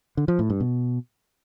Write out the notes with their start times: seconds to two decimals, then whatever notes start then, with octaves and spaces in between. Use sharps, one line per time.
0.17 D3
0.28 F3
0.39 A2
0.50 G2
0.60 B2